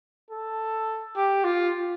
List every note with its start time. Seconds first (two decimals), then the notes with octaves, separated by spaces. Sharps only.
0.30 A4
1.16 G4
1.44 F4